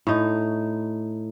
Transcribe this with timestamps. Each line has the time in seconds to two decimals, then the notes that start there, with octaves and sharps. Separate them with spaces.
0.07 A2 D#4